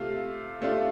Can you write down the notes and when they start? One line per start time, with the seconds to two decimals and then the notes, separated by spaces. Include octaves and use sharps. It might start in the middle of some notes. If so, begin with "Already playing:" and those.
Already playing: C3 A3 F4 F5
0.61 C3 A3 D4 F4